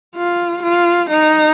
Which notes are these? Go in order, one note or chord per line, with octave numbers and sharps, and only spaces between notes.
F4
F4
D#4